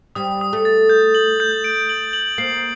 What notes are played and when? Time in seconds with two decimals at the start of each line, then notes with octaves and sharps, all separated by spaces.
0.15 G3 D#6
0.41 D#6
0.53 A3
0.65 A6
0.89 G6
1.15 F#7
1.40 G6
1.64 D7
1.89 F#7
2.13 F#7
2.38 A#3 C7